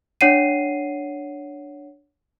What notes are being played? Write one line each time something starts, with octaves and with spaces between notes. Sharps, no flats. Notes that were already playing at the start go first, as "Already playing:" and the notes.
D4 C#5 F#5 C7 D#7